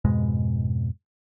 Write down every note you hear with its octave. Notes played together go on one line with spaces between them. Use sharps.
F2 G#2 B2 G#3